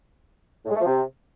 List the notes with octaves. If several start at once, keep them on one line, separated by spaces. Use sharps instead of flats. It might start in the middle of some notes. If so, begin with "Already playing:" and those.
A2
G#3
A3
F3
C3